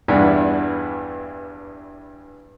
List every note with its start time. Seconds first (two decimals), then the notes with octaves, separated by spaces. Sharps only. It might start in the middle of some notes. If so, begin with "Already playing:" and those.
0.08 E2 G2 E3 B3 D4